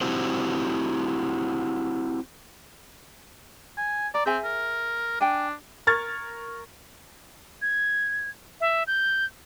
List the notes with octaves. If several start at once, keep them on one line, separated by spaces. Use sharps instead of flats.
C4 E4 F#4 G4 C5
G#5
D5 A#5
C4 G#4 E5 G#5
A#4
D4 G5 G#5
A#4 C#6 F6 G#6 A6
G#6
E5
G6